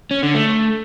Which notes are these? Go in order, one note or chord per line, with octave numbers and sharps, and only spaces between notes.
C#4
D3
A3